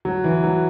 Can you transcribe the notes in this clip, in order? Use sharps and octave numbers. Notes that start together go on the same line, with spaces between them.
F#3
E3
F#3